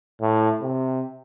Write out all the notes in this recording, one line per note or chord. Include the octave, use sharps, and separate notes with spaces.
A2
C3